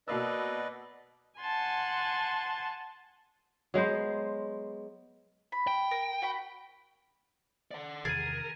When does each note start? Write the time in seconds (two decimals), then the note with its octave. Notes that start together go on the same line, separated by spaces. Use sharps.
0.08 B2 A#3 B4 D5 D#5 E6
1.39 F#5 G#5 A5 C6
3.74 F#3 G#3 B3 C5
5.52 B5
5.67 G5
5.91 A#4
6.22 F#4 F#5 B5
7.71 D5 F#5
8.05 E2 C3 D#3 G#4 A#4 A6 D#7